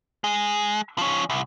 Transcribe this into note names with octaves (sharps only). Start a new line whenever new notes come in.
G#3
F3 C#4
C2